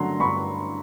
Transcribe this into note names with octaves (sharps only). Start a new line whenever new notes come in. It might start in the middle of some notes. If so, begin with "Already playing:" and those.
Already playing: G2 D3 F#3 A3 A#5 C6
G2 B5 C#6